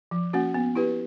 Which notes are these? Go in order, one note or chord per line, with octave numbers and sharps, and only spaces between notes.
F3
A#3 C#4 F#4
B3
E4 G4 B4